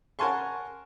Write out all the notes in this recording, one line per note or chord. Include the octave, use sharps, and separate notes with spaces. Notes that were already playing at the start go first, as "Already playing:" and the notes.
A#4 F#5 G#5 A5 C6 C#6